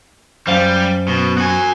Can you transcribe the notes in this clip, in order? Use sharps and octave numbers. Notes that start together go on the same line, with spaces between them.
F#2 G3 C5 F5
B2
F#4 G#5